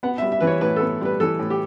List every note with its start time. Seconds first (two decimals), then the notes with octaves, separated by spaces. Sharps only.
0.03 B3 F#5
0.18 E5
0.22 G3
0.32 E5
0.40 E3 B4
0.47 C#5
0.61 A2 B4
0.76 A4
0.81 B3
1.01 G3 B4
1.20 E3 A4
1.39 A2
1.50 G4